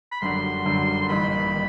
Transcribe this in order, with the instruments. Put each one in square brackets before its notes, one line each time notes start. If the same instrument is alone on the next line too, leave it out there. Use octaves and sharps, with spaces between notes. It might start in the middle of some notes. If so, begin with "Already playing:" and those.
[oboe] B5
[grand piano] G1 F#2 D3 G3 [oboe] C6
[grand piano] G1 F#2 D3 G3
[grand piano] A1 G2 D#3 G3 A#3 [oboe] B5
[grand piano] D#3